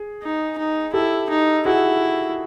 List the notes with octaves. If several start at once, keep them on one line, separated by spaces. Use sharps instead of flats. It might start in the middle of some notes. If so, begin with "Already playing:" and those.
Already playing: G#4
D#4
D#4
E4 G4 A4
D#4
E4 F#4 G#4